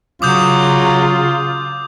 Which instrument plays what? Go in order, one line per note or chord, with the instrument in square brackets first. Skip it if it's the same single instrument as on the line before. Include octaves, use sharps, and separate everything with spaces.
[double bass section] C#3 [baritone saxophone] F#3 [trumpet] F4 [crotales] D6 D#6 G6